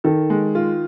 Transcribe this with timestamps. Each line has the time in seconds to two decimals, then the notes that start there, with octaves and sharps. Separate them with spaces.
0.04 D#3 A4
0.30 G#3
0.55 F4